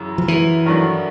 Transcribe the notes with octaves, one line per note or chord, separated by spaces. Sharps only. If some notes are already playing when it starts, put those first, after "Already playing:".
Already playing: F#2 C#3 E3
F3
E3
G2 D#3 F#3 A3 D4